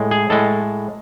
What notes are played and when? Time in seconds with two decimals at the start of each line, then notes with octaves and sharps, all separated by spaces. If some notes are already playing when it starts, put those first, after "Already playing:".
Already playing: A2 G#3
0.11 G#4
0.30 A2 G#3 A4